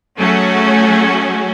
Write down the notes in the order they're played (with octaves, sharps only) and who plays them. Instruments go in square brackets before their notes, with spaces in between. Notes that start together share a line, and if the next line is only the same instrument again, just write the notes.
[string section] F#3 A3 C#4 F#4 G#4